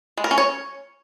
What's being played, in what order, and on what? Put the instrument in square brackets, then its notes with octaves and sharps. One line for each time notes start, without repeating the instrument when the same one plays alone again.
[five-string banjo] G#3
A#4
C#4
C#5